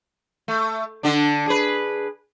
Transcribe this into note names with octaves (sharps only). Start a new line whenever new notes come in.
A3
D3 D4
G#4 B4